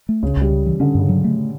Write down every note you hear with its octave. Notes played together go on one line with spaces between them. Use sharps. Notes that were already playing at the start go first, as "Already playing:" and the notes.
A3
C#2 C#3
C#2 G3
C#3
E3
D3 C#4
G2 C#3
F#3
A3